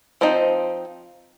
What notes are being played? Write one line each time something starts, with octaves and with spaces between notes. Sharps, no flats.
F3 C4 D#4 C5